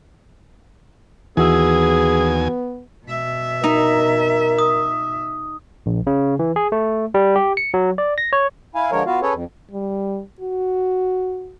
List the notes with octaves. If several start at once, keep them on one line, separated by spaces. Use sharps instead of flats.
D#2 E3 B3 F#4 G#4 G#5 E6
B2 E5
D#4 A#4
D#6
A#1
C#3
E3
G#4
A3
G3
G4
C#7
F#3
D5
A#6
C#5
E4 F5 G#5
D3 F3 G#3 A#4 C#5
B3 F4 F#4 F5
C#4 G#4 A4 B4 C#5
F2
G3
F#4